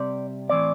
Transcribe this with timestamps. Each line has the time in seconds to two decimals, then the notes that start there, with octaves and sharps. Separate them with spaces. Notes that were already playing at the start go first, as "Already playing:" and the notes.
Already playing: C3 G3 C4 D5
0.49 A2 E3 C4 D5